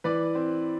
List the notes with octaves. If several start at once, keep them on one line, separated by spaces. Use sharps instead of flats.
E3 B4 D5
C4